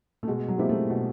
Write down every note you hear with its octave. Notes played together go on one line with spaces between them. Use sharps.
A3
B2 G#3
F#3
G#3 A#3 C4 E4 G4
A3
B2